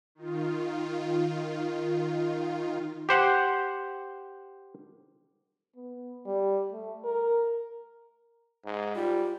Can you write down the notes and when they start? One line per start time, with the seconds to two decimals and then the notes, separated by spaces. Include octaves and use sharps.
0.15 D#3 F4
3.09 G4 C5 F#5
5.75 B3
6.26 G3
6.72 A3
7.04 A#4
8.65 G#2
8.95 G3 F4